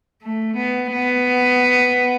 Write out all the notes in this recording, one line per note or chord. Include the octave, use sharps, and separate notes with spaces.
A3
B3
B3